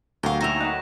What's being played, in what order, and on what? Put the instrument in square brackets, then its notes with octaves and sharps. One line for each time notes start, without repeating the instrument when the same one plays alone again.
[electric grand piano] D2 [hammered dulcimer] F#3 G4 A#4 [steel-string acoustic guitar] D#5 F5
[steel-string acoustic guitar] A#3 D#4 [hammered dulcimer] F#4 C#5 E5 [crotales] A#6 E7 F7
[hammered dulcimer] D#5 B5 [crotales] F#6 E7